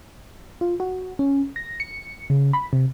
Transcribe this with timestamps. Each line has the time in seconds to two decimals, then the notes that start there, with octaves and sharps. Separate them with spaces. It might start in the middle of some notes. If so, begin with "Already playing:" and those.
0.61 F4
0.80 F#4
1.19 C#4
1.56 A#6
1.80 C#7
2.30 C#3
2.53 B5
2.73 C3